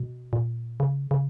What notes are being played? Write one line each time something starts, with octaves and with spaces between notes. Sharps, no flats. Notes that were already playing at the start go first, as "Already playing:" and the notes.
Already playing: B2
A#2
C#3
C#3